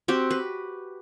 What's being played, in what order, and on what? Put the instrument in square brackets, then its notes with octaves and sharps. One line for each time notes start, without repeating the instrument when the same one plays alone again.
[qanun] C4 F#4 G4
B4